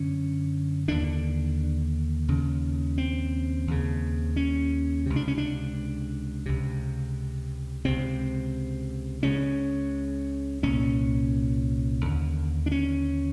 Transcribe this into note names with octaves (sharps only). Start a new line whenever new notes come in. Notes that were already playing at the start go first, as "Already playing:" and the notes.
Already playing: F#2 D3 C#4
D#2 D3 D4
D#2 C#3
C4
D#2 C#3
C#4
C#2 C3
D4
C#4
D4
C#2 C3
C#2 C3 C4
C#2 C#3 C#4
C2 A#2 C#4
D#2 D3
D4
C#4